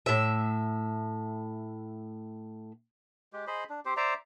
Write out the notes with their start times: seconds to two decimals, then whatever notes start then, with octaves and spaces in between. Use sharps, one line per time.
0.06 A2 E5
3.33 G#3 G4
3.47 G#4 C5 D#5 B5
3.70 D4
3.85 C4 G4 C5
3.97 C5 D5 E5 A#5